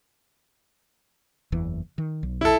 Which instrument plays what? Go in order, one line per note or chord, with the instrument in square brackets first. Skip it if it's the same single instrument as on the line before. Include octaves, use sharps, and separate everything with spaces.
[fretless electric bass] F#1 E2 E3
D#3
B1
[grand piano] E4 A4